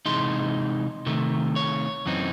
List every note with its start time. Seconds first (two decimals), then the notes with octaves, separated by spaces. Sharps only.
0.06 C3 E3 G#3 D#4 C6
1.06 C3 D#3 A3
1.56 C#5
2.06 F#2 E3 C4 D#4